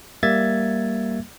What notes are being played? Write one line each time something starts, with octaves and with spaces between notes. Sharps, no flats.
G3 A#3 E5 G#6 A6